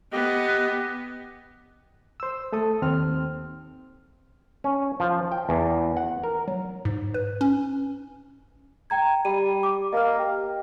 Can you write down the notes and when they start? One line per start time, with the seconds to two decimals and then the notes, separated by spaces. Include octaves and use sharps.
0.12 B3 G4 D#5
2.20 C5 E6
2.52 A3 A4 D#6
2.82 D#2 C4 F6
4.64 C#4
5.00 F3
5.32 G5
5.49 E2
5.97 F#5
6.24 A#4
6.48 F#3
6.85 G#2
7.14 B4
7.41 C#4
8.90 G5 A#5 G#6
9.25 G3 D#7
9.63 D6
9.93 A#3 D#5 F6
10.19 G4